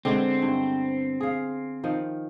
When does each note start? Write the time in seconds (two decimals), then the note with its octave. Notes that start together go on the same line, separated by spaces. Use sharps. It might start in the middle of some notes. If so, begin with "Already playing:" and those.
0.05 D3 G#3 B3 C4
0.42 G2
1.21 G#4 F5
1.84 D#3 F3